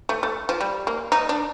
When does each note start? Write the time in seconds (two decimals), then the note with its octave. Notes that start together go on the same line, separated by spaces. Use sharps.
0.09 A3
0.23 A3
0.49 F3
0.61 G3
0.87 A#3
1.12 D#4
1.29 D4